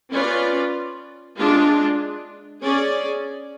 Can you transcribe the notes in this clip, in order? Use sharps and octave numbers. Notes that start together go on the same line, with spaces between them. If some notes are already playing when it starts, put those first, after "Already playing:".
C#4 F4 B4 D5
G#3 D4 F4
C#4 G#4 D5